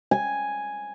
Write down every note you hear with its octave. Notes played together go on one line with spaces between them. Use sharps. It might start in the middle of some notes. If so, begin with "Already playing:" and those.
G#5